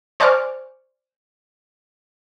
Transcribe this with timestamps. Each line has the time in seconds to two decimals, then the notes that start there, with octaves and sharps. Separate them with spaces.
0.20 C5 D5 G#5 C#6 D6 F6